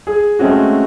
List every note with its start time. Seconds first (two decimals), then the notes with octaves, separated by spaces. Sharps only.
0.07 G#4
0.39 G#3 A3 C4 C#4 F#4